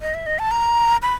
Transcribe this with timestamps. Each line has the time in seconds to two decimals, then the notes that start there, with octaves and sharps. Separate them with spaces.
0.01 D#5
0.14 E5
0.26 D#5
0.39 A5
0.51 A#5
1.02 B5